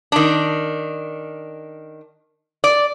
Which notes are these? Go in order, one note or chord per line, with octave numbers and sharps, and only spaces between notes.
D#3 D4
D5